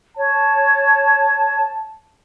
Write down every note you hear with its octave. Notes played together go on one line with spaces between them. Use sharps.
C#5 A5